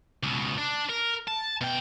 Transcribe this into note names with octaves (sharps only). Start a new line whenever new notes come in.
C#2 B2
D4
A#4
A5
B2 G5